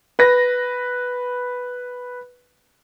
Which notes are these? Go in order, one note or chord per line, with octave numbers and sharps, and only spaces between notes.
B4 A#6